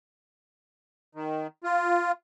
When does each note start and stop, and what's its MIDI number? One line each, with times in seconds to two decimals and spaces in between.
1.15 1.47 51
1.64 2.12 65